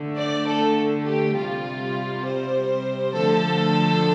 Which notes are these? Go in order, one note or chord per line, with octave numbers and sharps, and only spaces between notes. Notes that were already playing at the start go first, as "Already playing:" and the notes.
Already playing: D3 A3
D5
A4
G4
C3 G3 F4
C5
D3 F3 A3 A4